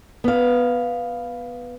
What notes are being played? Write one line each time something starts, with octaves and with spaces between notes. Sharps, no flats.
B3 F5